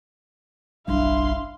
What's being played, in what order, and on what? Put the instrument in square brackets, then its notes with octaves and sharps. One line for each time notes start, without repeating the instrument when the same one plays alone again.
[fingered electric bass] F#1 B1 G3 [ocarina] D4 [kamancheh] E4 [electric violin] F5 C6